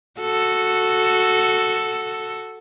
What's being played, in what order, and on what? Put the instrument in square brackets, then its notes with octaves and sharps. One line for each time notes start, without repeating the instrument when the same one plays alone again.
[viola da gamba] F#4 A4